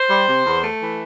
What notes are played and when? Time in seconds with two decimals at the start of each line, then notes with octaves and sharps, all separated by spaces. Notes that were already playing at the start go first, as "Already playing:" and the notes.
Already playing: C5
0.09 G3
0.28 C3
0.45 E2
0.63 A3
0.80 E3